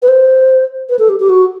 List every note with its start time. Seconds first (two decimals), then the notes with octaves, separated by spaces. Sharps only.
0.02 B4
0.08 C5
0.89 B4
0.99 A4
1.09 G4
1.20 G4
1.29 F#4